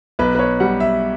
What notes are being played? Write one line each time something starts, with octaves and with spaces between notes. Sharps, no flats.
B1 B4
B4
C#5
G3 F#5
E5